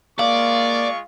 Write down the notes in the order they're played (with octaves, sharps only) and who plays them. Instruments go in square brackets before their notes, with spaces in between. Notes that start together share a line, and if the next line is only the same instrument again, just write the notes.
[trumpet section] G#3 F4 C#6 [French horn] A#3 [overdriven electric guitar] D5 [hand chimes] F5